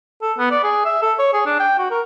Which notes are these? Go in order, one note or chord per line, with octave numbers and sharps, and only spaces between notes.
A4
B3
D5
G#4
E5
A4
C#5
G#4
D4
G5
F#4
A#4